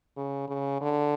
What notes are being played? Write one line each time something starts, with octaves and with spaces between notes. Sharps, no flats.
C#3
C#3
D3